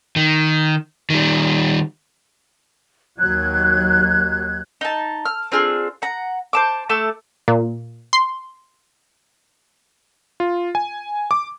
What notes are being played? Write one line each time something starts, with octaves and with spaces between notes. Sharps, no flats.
D#3
D#3 G3
D#2 F#3 F#6 G#6
D#4 A5
F6
C4 D4 F4 G#4
F#5 A#5
C5 A5 D6
A3 A5 D6
A#2
C6
F4
G#5
D6